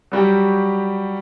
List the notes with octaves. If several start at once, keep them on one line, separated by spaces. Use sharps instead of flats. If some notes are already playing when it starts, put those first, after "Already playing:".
F#3 G3 F#4 G4